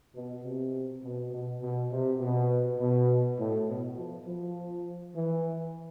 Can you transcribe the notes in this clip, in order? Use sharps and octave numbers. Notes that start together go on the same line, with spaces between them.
B2
C3
B2
B2
B2
C3
B2
B2
A2
B2
F3
F3
E3